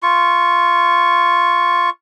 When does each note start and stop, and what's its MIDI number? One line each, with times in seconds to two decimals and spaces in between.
0.03 1.90 65
0.03 1.90 85